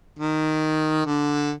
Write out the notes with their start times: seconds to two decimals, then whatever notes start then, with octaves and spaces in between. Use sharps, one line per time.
0.19 D#3
1.06 D3